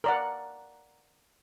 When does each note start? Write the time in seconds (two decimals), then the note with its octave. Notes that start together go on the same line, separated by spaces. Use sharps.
0.04 A#4 D5 F#5